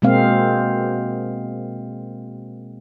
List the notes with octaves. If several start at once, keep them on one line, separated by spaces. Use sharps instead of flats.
B2 G#3 A#3 C4 F5